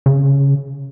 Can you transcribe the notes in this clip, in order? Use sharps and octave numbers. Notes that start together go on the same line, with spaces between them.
C#3